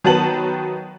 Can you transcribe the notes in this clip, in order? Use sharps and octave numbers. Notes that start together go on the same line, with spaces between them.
D#3 F#3 B3 A5 F#7